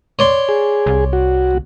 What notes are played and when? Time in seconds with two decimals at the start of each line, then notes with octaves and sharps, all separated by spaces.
0.19 C#5 D5 C6
0.49 G#4
0.86 C2
1.13 F#4